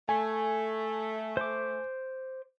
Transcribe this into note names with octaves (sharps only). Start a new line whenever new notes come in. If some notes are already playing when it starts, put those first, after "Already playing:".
A3 G#5
C5 D6